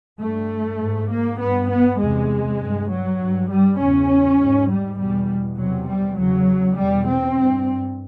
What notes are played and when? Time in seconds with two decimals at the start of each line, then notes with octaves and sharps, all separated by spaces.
0.20 G2 A3
0.80 G#2
1.10 A#3
1.40 G2 B3
1.70 B3
2.00 E2 C3 G#3
2.60 G2
2.89 F#3
3.19 G2
3.49 G3
3.79 E2 C#3 C#4
4.38 G#2
4.69 G3
4.98 E2 B2 G3
5.58 E2 C3 F#3
5.88 G3
6.17 E2 C#3 F#3
6.77 E2 B2 G3
7.07 C4
7.37 G2